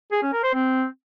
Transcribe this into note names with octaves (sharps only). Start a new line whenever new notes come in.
G#4
C#4
A#4
C5
C4